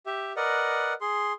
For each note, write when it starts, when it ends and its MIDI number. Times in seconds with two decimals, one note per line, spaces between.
0.06 0.33 67
0.06 0.33 76
0.36 0.93 70
0.36 0.93 71
0.36 0.93 74
0.36 0.93 75
0.36 0.93 78
1.01 1.33 68
1.01 1.33 84